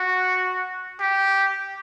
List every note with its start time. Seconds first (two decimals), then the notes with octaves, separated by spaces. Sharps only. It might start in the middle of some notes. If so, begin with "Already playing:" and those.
Already playing: F#4
1.00 G4